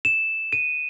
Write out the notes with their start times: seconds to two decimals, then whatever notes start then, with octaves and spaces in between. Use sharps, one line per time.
0.05 E7
0.53 D#7